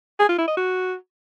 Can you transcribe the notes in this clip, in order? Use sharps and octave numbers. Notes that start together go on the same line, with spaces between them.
G#4
F4
E4
D#5
F#4